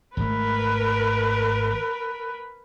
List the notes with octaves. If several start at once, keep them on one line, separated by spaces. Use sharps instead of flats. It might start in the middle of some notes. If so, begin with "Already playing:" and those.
G#1 A3 A#4 B4